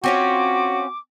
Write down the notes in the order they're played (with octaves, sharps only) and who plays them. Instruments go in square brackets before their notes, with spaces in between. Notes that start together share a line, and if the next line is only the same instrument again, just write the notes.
[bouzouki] C4 C#4 F4 [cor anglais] F#4 [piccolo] D6